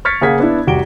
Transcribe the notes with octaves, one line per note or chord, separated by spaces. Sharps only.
C#6 F6 G#6 A6 B6 C#7
C#3 A#3 G#4 F#5 G#6 B6
B3 D4 E4
F1 C2 F#4 G4 D7 G7